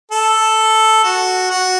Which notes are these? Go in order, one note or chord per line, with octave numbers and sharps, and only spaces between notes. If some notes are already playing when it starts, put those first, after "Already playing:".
A4
F#4
F#4